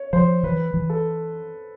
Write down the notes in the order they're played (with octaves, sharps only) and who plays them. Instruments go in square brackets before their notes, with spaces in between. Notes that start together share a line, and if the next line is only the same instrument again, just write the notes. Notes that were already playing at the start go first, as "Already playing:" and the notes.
Already playing: [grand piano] C#5
[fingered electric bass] F3 [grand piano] C5
[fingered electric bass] E3 [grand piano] B4
[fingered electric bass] E3
[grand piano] A4